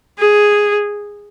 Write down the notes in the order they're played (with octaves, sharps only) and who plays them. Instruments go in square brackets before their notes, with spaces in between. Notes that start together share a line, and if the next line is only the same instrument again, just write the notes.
[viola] G#4